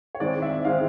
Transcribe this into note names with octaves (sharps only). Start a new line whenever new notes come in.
C#5
D#3 G#3 C4 D5
E5
D#3 G#3 C4 F5